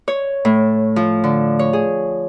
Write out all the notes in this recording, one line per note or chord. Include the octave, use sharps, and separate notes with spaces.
C#5
A2
F3
D3
C#5
G#4